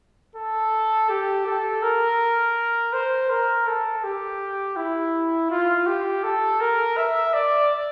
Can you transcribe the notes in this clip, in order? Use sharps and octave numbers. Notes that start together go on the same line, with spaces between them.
A4
G4
A4
A#4
C5
A#4
A4
G4
E4
F4
G4
A4
A#4
E5
D5